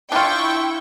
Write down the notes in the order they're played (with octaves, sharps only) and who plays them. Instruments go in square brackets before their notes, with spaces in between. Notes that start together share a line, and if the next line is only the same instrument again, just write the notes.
[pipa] D4 F4 [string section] E4 G5 C#6